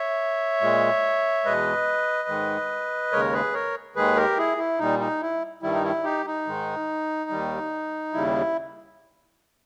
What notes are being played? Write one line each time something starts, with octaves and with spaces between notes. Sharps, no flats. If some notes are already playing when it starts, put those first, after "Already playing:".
Already playing: C#5 E5
A#2 G#3
E2 B2 G#3 B4 D#5
G#2 D#3 G#3
D#2 C#3 G#3 A#4 C#5
G#4 B4
A#4 C#5
D#2 D#3 G#3 G#4 B4
G4 A#4
E4 G#4
E4
A#2 G3 D#4
D#4
E4
G2 D#3 G3 E4
D#4
E4
D#4 G4
D#4
G#2 D#3 G#3
D#2 D#3 G3
D#2 C#3 G3 E4